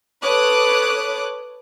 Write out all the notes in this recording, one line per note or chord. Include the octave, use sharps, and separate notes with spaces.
A4 B4 C#5 D6 D#6 F#6